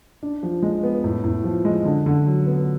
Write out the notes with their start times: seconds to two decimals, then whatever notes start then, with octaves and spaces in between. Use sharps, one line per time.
0.23 D4
0.43 F3
0.62 G#3
0.83 B3
1.04 A2
1.24 A2
1.44 F3
1.65 G#3
1.85 D3
2.06 D3
2.26 F#3
2.47 B3